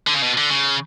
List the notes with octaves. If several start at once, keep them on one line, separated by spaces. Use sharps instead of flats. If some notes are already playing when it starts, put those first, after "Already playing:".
D3
C#3
B2
D3
C#3